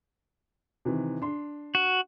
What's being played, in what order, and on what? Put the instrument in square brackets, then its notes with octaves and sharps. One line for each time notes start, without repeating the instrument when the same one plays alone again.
[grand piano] C3 D#3 E3
D4 C6
[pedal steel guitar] F#4